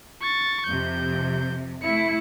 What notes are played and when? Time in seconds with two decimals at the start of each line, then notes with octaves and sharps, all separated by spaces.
0.22 C#6 A6
0.67 F2 C3 G6
1.83 A3 E4 C#7